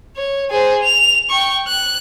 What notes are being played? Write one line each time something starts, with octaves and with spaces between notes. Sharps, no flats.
C#5
G#4 C5
F7
G5 C#6
F#6